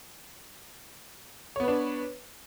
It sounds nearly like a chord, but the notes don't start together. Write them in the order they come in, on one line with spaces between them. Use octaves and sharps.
C#5 B3 B4 D4